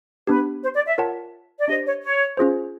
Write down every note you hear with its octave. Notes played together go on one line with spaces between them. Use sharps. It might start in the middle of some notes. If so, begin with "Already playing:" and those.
B3 D4 G4 B4
C5
D5
E5
F4 A#4 C#5 F#5 A5
D5
D4 G4 C5 D#5
C#5
C#5
C#4 F4 G#4 C5